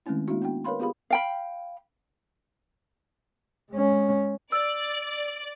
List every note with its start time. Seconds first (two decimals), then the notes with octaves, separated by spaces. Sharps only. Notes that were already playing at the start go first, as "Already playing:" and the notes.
0.06 D#3 G#3 A3 C4 C#4 E4
0.28 G#3 A#3 D4 E4 F#4
0.42 B3 D4 F#4 G5
0.64 A#4 B4 C#5 F5 B5 C6
0.79 B3 F4 G4 G#4 F5 B5
1.10 F5 G5 B5
3.71 G#3 C#4
4.52 D5 E6